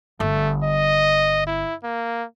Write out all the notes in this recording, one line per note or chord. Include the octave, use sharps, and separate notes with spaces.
G1 A3
D#5
E4
A#3